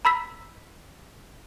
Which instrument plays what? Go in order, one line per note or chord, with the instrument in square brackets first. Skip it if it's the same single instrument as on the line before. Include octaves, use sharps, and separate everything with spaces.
[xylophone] A#5 B5 E6 B6